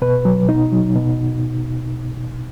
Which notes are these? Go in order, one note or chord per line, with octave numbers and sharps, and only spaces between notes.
B2 B4
F#3
B2 D#4
F#3
B2